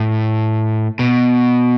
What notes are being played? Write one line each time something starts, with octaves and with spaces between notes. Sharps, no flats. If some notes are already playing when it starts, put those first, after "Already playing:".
Already playing: A2
B2